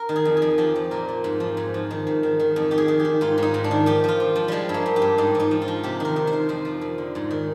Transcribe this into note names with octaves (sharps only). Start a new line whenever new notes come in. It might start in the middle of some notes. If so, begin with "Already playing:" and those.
Already playing: A#4
D#3
G#4
F2
G#4
F2
F3 G4
F3
A#2 A#4
A#2
G#2
F3
G#2
F3
D#3
G#2
D#3
D#3
F2
D#3 G4
G#4
D#3
G4
D#3
G#2 F4
G#2 D#4
G#2
D4
D#3
F3 G4
F3 F4
F3
F3
F3 G3 G#3
G2
A#3
G2
G4
G2
G#2 D#4
F3 D#4
F3
F4
F3
C3 G4
D#3 A#4
D#3
C5
D#3
F2 C5
F3
F2
D3
G#2
D#3